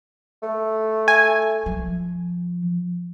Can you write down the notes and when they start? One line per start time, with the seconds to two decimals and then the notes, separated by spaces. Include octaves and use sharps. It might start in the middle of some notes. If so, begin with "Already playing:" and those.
0.43 A3
1.08 G#5
1.66 F3